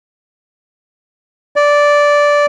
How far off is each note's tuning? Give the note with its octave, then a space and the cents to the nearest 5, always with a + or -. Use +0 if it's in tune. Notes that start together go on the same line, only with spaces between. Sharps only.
D5 -10